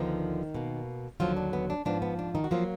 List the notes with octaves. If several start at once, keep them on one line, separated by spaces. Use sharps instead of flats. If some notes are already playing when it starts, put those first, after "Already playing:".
Already playing: D2 D3 D#3 F3 B3 D#4
B2 A#3
D#2 D3 F3 F#3 F4
D4
B3
D4
G#2 F3 B3 D4
B3
D4
D#3 D#4
F#4
F3 F#3 A#3 F4